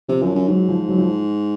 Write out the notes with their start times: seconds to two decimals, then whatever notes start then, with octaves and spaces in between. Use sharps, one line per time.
0.09 C3 F3
0.22 F#2 F3
0.35 F#2 F3
0.48 G#2 F#3
0.69 F3
0.89 F#3
0.98 F3